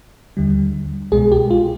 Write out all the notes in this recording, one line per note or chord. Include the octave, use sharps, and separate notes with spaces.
D#2 D3 G3
C2 B2 G#3 G#4
G4
F4